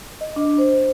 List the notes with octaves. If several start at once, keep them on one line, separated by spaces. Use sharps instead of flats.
D#5
D4
C5